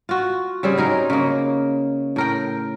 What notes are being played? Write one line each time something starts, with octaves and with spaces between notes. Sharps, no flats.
F4 F#4
C#3 G3 C4 G#4
F#3 D#4 A#4
C#3 A#3
A2 A#4 G5